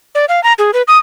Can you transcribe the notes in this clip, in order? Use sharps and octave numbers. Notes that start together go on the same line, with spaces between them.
D5
F5
A#5
G#4
B4
D#6